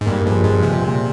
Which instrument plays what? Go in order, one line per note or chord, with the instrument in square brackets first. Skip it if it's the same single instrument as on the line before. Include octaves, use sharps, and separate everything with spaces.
[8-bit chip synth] G#2
[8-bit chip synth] G2 [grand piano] G3 A#3
[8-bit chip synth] G2 [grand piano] F3 G#3
[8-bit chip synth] G2 [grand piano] F3 G#3
[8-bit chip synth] C3 [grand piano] F3 G#3
[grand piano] A#2